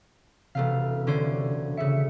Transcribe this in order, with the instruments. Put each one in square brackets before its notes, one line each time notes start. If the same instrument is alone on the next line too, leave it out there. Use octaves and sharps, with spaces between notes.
[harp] E1 A3 F5 [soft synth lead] C3
[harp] D3 C#4 C5
[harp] C#3 C#7 [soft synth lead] E5